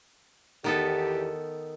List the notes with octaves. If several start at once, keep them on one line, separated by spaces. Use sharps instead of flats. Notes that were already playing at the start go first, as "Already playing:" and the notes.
E2 D#3 B3 G4 A4